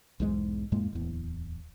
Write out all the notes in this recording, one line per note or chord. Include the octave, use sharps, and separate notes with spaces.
B1 E2 G#2 G#3
F2 A2 G#3 A#3
D1 E2